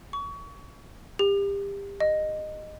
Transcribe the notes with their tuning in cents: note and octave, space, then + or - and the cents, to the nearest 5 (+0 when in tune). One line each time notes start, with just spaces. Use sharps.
C#6 +30
G4 +25
D#5 -15